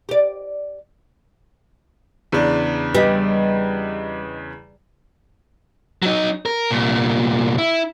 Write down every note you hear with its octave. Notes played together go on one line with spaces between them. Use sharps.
G4 D5
E2 C#3 D4
G3 B4 D#5
F#3 D#4
A#4
C2 A#2
E4